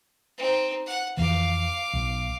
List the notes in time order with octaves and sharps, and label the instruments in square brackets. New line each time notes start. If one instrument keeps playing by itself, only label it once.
[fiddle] C4 D#4
F#5
[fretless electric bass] F2 E3 [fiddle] F5 D6
[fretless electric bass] B1